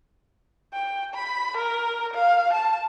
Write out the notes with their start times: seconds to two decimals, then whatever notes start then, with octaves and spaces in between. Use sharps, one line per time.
0.74 G5
1.14 B5
1.58 A#4
2.14 F5
2.54 A5